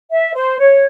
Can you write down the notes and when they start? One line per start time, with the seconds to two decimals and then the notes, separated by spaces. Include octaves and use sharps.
0.11 E5
0.35 C5
0.59 C#5